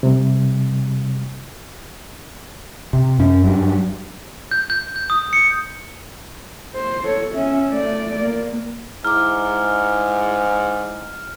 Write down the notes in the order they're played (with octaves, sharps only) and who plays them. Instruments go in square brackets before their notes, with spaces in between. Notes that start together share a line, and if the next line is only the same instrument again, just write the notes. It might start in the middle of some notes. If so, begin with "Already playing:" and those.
[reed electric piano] C3 G3
[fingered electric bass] C3
F#2 C#4
G2 F#3
[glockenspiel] G6
G6
G6
D#6
C#7
[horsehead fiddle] C5
A4 C#5
C#4 E5
A3 D5
A#3
[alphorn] G#2 [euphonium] E4 [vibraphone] A#5 D6 [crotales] F6